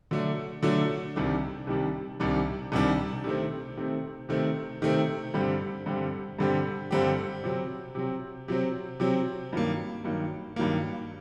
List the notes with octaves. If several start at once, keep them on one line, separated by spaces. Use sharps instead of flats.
D3 F#3 A3 D4
D3 F#3 A3 D4
C2 C3 D#3 G3 D4
C2 C3 D#3 G3 D4
C2 C3 D#3 G3 D4
C2 C3 D#3 G3 D4
C3 D#3 A3 C4
C3 D#3 A3 C4
C3 D#3 A3 C4
C3 D#3 A3 C4
G2 D3 G3 C4 G4
G2 D3 G3 C4 G4
G2 D3 G3 C4 G4
G2 D3 G3 C4 G4
C3 F#3 C4
C3 F#3 C4
C3 F#3 C4
C3 F#3 C4
G2 D#3 F#3 A#3
G2 D#3 F#3 A#3
G2 D#3 F#3 A#3